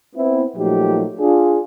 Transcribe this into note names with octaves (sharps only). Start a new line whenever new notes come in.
B3 C4 E4
A#2 F3 F#3 A3 D#4 G4
D4 F4 G#4